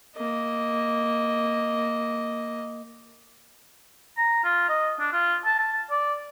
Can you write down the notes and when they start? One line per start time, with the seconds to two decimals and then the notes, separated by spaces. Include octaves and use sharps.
0.17 A#3 D#5
4.17 A#5
4.44 F4
4.69 D#5
5.00 D4
5.13 F4
5.45 A5
5.59 A5
5.90 D5